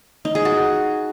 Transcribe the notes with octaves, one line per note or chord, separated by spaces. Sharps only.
D#4
G#4
F#4